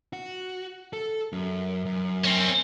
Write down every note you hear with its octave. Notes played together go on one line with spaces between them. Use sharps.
F#4
A4
F#2
F#2
C4 C#4